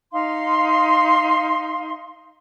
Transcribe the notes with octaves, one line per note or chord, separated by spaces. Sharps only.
D#4 F5 C6